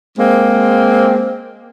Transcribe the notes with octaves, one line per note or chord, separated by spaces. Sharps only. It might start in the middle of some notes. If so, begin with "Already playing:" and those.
G#3 A#3 C4